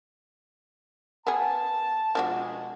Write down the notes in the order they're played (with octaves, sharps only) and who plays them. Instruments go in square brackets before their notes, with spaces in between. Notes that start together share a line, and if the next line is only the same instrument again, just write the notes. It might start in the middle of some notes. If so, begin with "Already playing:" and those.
[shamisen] B3 G#4 [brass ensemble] A5
[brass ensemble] B2 G#3 [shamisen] F3 D4 F#4